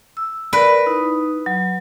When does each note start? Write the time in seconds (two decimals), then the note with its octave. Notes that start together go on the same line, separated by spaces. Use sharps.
0.17 E6
0.53 A#4 B4 D5
0.86 D#4 E4
1.46 F#3